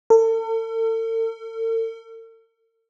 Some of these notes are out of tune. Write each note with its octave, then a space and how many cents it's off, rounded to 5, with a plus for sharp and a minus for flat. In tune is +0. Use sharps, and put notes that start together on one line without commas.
A4 +45